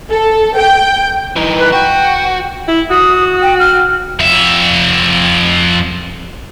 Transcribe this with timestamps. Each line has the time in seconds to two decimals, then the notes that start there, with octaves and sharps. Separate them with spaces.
0.10 A4
0.57 G5
1.36 E3 D#4
1.57 B4
1.72 F#4 G5
2.68 E4
2.90 F#4 D#6
3.42 G5
3.59 F6
4.20 F2 E5